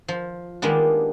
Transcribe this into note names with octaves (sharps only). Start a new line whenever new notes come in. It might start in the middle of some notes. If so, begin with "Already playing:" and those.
F3
D#3 G3 G#3 A#3 B3 D4